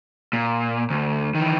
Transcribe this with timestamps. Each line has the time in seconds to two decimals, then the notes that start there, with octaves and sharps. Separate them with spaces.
0.33 A#2
0.91 D2
1.35 D#3 E3